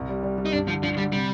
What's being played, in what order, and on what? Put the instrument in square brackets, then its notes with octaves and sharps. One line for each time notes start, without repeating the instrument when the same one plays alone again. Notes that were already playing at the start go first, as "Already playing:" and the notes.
Already playing: [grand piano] C2
G3
G3
G3
[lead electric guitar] D#4
[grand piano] G2 [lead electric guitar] D4
[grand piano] D3 [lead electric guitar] F3
[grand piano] G2 [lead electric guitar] F3
[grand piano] D3 [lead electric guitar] G3
[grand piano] C3 [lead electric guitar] G3